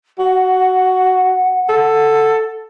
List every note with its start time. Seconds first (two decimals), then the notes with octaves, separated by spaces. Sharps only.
0.19 F#4 F#5
1.69 A4